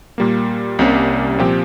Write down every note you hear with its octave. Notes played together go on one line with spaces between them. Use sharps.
A#2 G3 A#3
C2 C3 G3 A#3 C#4
A#2 F3 C4 G4